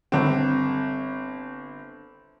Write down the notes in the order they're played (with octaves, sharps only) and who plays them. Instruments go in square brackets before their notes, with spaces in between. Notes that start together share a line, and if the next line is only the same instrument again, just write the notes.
[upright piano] G1 C4